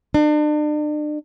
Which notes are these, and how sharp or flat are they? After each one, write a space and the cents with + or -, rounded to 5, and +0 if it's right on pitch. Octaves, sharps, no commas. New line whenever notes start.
D4 +40